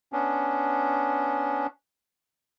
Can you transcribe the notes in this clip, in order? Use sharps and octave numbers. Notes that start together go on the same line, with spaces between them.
B3 C#4 D4